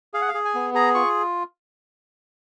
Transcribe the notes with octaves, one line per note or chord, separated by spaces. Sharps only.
G#4 F5
F#5
F5
G#4
G#5
B3
G#4 A#5
F4 C#6